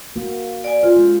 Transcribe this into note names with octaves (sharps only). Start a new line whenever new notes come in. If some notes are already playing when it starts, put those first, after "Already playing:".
A#3 F#4
D5 G#5
F4 G#4 C5
G#3 C#4